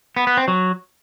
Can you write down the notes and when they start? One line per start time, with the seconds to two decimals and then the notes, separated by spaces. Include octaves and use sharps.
0.17 B3
0.27 B3
0.37 C4
0.48 F#3